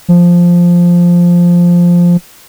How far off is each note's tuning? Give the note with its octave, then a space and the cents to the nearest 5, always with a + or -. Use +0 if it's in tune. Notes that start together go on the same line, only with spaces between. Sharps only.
F3 +0